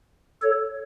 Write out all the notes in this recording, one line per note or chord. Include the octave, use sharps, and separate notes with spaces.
A4 C#5